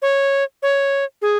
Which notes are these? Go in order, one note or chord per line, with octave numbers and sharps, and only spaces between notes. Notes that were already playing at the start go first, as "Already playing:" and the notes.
C#5
C#5
G#4